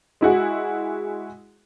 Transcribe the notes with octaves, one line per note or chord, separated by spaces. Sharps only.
G#3 E4 F#4 G#4